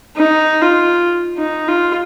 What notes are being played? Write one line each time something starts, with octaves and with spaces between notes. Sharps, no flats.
D#4
F4
D#4
F4